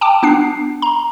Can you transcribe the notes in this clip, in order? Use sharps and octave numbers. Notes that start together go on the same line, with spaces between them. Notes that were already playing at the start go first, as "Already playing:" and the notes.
G5 A5 D6
B3 D4 C7
A#5